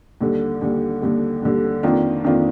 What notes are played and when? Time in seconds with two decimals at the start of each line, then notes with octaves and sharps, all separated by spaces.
0.21 D#2 D3 G3
0.61 D#2 D3 G3
1.02 D#2 D3 G3
1.42 D#2 D3 G3
1.83 F2 D#3 A#3 D4 F4
2.25 F2 D#3 A#3 D4 F4